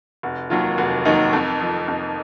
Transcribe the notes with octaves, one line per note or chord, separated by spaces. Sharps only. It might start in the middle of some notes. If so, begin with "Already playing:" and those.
F1 F#4
D#2 D#3 F#3 F4
F1 F#4
D#2 D#3 F#3 D#4
F2
F3
F2